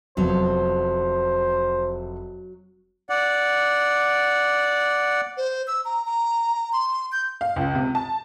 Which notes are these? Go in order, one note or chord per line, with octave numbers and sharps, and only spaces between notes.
F1 F3 F#3 B3 C5
D5 F#5
C5
E6
A#5
A#5
C6
G6
F5
C#2
C3
A5